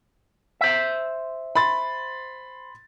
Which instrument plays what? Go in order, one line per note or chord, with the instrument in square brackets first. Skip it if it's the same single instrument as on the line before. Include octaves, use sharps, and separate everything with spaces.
[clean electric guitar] C5 E5
[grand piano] B5 C6 A6